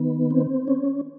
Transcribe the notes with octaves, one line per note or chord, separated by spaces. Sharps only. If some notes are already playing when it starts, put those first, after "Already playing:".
Already playing: D#3 B3
C4
C#4